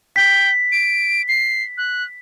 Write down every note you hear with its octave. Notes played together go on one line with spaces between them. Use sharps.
G5 B6
D7
C7
F#6